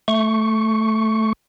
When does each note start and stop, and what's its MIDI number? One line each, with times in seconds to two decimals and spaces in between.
0.08 1.33 57
0.08 1.33 85